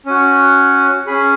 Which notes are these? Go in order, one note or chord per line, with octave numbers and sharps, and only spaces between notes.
C#4 F#4
C#4 G#4 B5